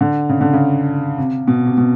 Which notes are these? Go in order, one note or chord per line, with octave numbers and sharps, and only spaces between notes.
D3
C#3
D3
C#3
C3
B2
C3
B2